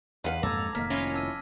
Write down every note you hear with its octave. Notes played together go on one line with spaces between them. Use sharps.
E2 B4 F5 F#5
F2 G#2 A#3 A4 A#5 D6 G#6
F1 D#3 A#3 F6 B6
C#4 E4 F4 A#6
A5 E6 D#7